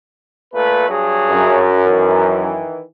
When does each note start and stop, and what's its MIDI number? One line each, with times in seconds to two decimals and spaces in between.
0.53 0.86 46
0.53 0.86 57
0.53 0.86 71
0.87 1.72 43
0.87 1.72 54
0.87 1.72 68
1.30 2.62 42
1.85 2.81 51
1.85 2.81 52